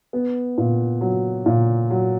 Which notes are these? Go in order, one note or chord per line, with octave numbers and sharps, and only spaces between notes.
B3
A#2
F#3
A#2
F#3